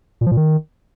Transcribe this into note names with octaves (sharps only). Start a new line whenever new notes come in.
A#2
F3
A#2
D#3